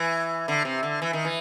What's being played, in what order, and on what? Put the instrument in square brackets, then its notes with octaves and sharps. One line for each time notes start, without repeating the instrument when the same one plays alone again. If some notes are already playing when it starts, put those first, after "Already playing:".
Already playing: [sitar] E3
D3
C3
D3
E3
D#3
E3